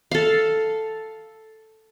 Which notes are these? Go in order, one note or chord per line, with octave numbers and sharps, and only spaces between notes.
A4 F5